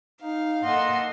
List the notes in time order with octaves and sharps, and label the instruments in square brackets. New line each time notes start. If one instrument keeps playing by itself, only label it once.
[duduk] D#4 [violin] F5
[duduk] A#3 [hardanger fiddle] A4 C6 [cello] D#5 F#5